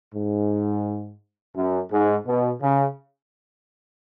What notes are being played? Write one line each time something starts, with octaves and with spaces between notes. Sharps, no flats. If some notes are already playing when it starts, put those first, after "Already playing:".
G#2
F#2
G#2
B2
C#3